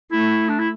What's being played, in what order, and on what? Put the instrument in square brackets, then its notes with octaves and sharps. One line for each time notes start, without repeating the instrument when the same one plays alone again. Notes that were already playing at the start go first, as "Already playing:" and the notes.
[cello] A3 [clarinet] E4
[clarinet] D4
E4